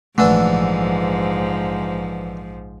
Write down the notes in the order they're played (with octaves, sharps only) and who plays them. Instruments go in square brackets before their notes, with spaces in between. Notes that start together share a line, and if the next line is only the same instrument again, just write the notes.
[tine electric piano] A#1 [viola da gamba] G#2 F3 [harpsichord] D3 E3 D4 [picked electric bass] A3